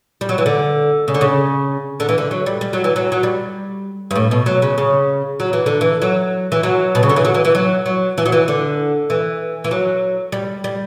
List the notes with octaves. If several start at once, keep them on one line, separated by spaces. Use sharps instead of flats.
G3
F#3
E3
D3
C#3
D3
C#3
D3
E3
D3
F#3
G3
G3
F#3
E3
F#3
F#3
G3
G2
A2
B2
F#3
C#3
C#3
F#3
E3
D3
E3
F#3
E3
F#3
B2
C#3
D3
E3
F#3
E3
E3
F#3
F#3
E3
F#3
E3
D3
E3
E3
F#3
G3
G3